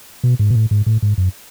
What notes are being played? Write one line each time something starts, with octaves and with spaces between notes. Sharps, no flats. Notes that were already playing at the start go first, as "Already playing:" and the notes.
B2
G#2
B2
A2
G#2
A2
G#2
F#2